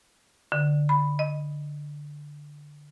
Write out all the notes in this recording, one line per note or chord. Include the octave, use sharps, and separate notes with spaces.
D3
B5
D#5